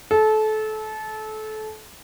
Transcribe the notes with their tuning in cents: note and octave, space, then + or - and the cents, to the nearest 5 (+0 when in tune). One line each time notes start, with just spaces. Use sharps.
A4 -25